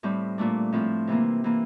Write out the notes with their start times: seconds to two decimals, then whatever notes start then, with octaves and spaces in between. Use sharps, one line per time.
0.03 A2 G3 C4
0.38 A#2 A3 D4
0.73 A2 F3 C4
1.07 C3 E3 A#3
1.44 E3 A#3